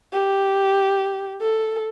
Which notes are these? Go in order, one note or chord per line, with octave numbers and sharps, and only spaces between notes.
G4
A4